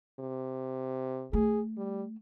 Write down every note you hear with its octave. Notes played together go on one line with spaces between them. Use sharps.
C3
A3 G#4
G3